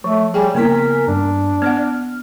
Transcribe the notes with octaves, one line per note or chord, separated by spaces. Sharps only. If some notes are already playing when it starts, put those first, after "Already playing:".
F3 A3
G3 G#4 C#5 G5 G#5
C#3 A#3 B3 E4 A#4 G#5 B6
G2 D4
B3 D5 F#5 F6